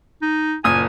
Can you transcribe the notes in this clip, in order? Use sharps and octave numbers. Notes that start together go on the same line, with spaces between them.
D#4
F#1 A#2 G#5 D#6